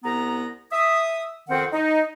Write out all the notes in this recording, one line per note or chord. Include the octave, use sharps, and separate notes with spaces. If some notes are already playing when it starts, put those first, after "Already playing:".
C2 B3 A#5
E5 D#6
F2 D#3 C4 F#5
D#4